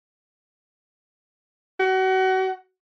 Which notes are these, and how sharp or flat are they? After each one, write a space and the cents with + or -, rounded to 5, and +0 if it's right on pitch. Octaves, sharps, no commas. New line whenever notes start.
F#4 +30